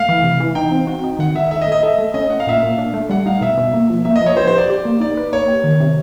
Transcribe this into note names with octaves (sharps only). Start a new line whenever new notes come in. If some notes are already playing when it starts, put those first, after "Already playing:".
Already playing: A3 F5
E3
C3
E3
D#4 G5
C4
F#4
D#4
D#3 F#5
D#3 E5
A3 E5
D#5
A3
D#5
A4 E5
A3
C#4 D#5
C#4 F#5
F5
A#2 E5
F5
A#2
D4
A3
G3 F#5
D#4 F5
B2 E5
B2
A#3
F3
A#3 E5
D#5
F3
C#5
G4 C5
C5
G4 D5
G4
A#3
D#4 D5
B4
A#3 C#5
G4
D#3
C3